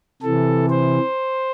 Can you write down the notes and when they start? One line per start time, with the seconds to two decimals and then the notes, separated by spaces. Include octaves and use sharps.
0.22 C3 E3 A4
0.70 C5